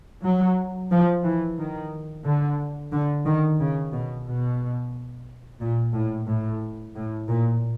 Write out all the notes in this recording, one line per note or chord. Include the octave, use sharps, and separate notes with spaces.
F#3
F3
E3
D#3
D3
D3
D#3
C#3
B2
B2
A#2
A2
A2
A2
A#2